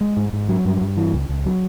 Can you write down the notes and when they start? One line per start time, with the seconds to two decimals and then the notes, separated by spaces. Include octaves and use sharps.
0.01 G#3
0.17 G#2
0.33 G#2
0.49 F#3
0.65 G2
0.81 G2
0.97 E3
1.13 C#2
1.29 C#2
1.46 F#3